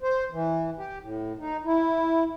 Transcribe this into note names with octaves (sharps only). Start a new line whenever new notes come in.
C5
E3
G4
A2
D#4
E4